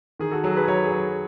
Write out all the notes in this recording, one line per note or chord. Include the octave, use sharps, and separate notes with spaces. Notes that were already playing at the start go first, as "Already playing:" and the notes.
D#3 G#4
F#4 A4
F#3 G#4
G#4 B4
F#3 A4 C#5
G#4
F#3
G#4